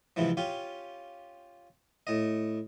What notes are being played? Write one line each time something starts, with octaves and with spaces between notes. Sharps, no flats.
G#2 C3 E3 F3
C#4 F4 G4
A2 D#5